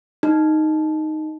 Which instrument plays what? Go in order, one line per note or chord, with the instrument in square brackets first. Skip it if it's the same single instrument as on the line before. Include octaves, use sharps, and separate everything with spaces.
[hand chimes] D#4